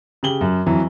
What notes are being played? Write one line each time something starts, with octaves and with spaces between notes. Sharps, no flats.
C#3 G4 F#7 G7
F#2
F2 E3 F#3